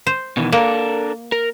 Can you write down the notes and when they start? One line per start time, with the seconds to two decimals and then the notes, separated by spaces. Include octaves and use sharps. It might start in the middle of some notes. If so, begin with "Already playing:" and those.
0.07 C5
0.37 B2 D#3 E3
0.52 A#3 D4 A4 A#4
1.32 A#4